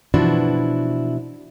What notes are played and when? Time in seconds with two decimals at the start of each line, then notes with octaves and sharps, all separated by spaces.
0.14 B2 E3 F3 D4 E4 F#4